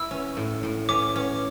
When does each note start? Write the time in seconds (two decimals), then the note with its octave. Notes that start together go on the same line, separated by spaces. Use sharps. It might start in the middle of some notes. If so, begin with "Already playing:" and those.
Already playing: E4 E6
0.11 C#4
0.37 A2
0.63 A2
0.89 C#4 D6
1.16 C#4